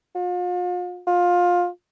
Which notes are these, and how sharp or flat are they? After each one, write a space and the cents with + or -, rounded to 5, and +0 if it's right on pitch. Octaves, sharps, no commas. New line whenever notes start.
F4 +40
F4 +20